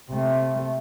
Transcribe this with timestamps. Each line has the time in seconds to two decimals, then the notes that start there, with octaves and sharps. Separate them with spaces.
0.10 C3 A3